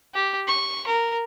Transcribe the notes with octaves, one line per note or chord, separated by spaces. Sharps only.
G4
C#6
A#4